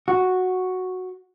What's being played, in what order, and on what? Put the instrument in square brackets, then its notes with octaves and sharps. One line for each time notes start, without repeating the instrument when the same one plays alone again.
[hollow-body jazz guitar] F#4